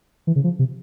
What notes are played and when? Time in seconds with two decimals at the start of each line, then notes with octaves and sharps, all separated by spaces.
0.27 E3
0.36 C#3
0.44 F3
0.59 C3